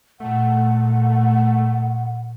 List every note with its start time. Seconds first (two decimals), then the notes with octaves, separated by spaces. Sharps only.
0.20 A#2 A3 F#5